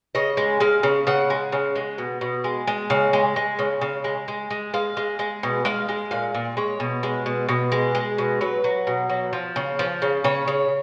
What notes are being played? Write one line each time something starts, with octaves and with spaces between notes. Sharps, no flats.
C#3 D#5
G#3
G#3 F5
C#3
C#3 F#5
G#3
C#3
G#3
B2
B2
G#3
G#3
C#3
G#3
G#3
C#3
C#3
G#3
G#3
G#3
G#3 F5
G#3
G#3
B2
G#3 F5
G#3
A#2 F5
A#2
G#3 C#5
B2
G#3
B2
B2
G#3
G#3
B2
F#3 B4
F#3
B2
F#3
F3
C#3
F3
C#3
C#3 C#5
C#3